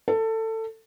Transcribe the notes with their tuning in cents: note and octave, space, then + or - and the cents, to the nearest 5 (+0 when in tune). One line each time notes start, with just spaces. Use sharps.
A4 +20